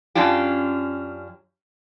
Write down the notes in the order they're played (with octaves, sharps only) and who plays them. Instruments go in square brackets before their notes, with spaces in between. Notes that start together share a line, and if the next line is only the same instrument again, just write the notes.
[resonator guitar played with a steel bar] F#2 C#4 D4 F4 G4